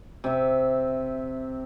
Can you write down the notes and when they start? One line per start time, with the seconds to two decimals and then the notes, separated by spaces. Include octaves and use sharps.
0.24 C3 E5